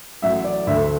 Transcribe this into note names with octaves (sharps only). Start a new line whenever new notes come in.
A1 A2 F#3 E5
D5
D2 D3 A3 E5